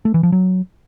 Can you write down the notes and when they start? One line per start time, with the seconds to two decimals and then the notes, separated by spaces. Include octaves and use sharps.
0.05 A3
0.14 E3
0.23 F3
0.32 F#3